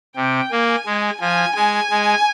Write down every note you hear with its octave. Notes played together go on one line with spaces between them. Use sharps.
C3 G5
A#3 G#5
G#3
F3 G#5
G#3 G#5
G#3